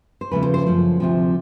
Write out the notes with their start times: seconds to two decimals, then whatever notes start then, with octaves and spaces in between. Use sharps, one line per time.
0.21 C5
0.31 E2 C#3 F3 A3 B4
0.43 C5
0.54 C5
0.65 F#2 C#3 F3 A3
1.00 D2 C3 F3